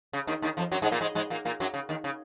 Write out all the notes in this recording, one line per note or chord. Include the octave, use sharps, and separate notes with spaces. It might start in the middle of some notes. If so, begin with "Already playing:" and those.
C#3
D#2 D#3
D#2 D#3
F2 F3
F#2 F#3
G#2 G#3
A#2 A#3
G#2 G#3
G#2 G#3
A#2 A#3
A#2 A#3
F#2 F#3
C#3
D#2 D#3
C#3